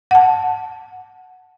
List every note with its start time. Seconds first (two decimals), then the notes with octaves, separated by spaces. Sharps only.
0.11 F#5 A5